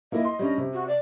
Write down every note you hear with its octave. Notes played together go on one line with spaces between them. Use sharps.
A#3 E4 D#5
C6
G3 C#4 D4
C3
F#4
D5